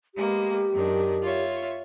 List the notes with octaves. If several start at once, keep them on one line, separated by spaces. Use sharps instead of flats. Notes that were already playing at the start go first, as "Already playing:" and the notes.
G#3 A#3 B3 G4
F#2 D#3 D4
F4 C#5 E5